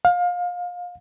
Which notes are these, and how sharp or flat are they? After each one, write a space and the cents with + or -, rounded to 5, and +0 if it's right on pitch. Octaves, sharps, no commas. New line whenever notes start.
F5 +30